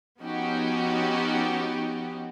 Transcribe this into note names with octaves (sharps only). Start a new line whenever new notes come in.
F3 B3 C#4 D#4 F#4 G4